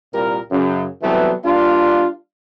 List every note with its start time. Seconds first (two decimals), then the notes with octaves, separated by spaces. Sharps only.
0.13 C2 A#2 G3 A#4
0.51 F#2 C#3
1.02 C3 E3 F#3 G3 A3 B3
1.45 G3 A#3 D4 F4